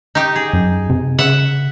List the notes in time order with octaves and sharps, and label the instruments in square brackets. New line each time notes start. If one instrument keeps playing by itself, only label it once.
[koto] D#4 G4
G#4
[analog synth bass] F#2
C3
[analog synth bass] C#3 [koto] E5 F#5